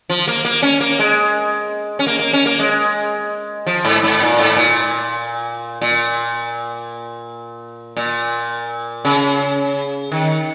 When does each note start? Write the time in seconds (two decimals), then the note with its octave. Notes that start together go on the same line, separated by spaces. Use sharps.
0.10 F3
0.28 A#3
0.45 A#3
0.62 C#4
0.81 A#3
0.99 G#3
1.99 C#4
2.07 A#3
2.19 A#3
2.33 C#4
2.46 A#3
2.59 G#3
3.67 F3
3.85 G#2
4.03 G#2
4.21 A#2
4.39 G#2
4.57 A#2
5.82 A#2
7.97 A#2
9.05 C#3
10.12 D#3